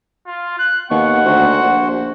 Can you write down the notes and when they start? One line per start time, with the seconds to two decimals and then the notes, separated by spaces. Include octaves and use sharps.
0.27 F4
0.58 F#6
0.90 D#2 B3 F#5 C#6
1.25 D2 F#4 C5
1.62 A#1